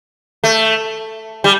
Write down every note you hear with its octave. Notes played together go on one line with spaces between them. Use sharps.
A3
G3